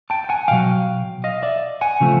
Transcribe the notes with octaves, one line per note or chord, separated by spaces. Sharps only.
G5 A5
G5
F#5 G#5
B1 B2 F#3 F5 G5
D#5 F5
D5 E5
F#5 G#5
C#3 F3 A3 C4